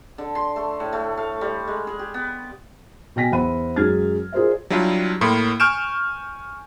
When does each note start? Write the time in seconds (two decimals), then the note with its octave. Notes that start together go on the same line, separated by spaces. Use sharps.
0.18 D3
0.35 C6
0.56 A3
0.80 A2
0.93 A3
1.17 F5
1.41 G3
1.68 G#3
1.87 G#4
1.99 G4
2.14 B3
3.16 B2 G5 G#5 A#6 B6
3.32 E2 C5 E5 F#5 B5 D#7
3.76 F#2 F#3 G#3 F6 G#6 A6
4.32 F4 G#4 A#4 C5 D5 E5
4.70 F#3 G3 D4 E4 F4
5.21 A2 A#3 B5 C6
5.60 G#5 C#6 F6 G6 D7 E7